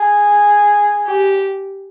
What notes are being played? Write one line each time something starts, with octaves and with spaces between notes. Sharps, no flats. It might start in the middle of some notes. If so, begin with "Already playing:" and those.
Already playing: G#4
G4